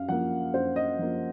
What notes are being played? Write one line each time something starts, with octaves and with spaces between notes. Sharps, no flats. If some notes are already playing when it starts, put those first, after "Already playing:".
Already playing: F#2 F5
F3 A#3 F#5
F#2 C5
D#5
F3 A#3